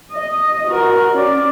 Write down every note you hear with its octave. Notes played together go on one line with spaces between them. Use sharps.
D#5
F#4 A#4
C#4 D5